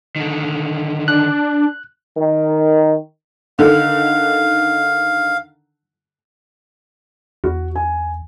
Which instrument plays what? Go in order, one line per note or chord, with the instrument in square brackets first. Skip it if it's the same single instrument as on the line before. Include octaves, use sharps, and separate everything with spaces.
[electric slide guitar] D3 D#3
[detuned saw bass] D4 [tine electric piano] F#6
[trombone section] D#3
[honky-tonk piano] D3 D#3 [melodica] F5
[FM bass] E2 [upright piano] F#4
[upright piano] G#5